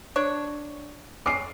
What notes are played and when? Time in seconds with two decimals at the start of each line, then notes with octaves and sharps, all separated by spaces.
0.16 D4 C#5
1.26 C#4 D6 C7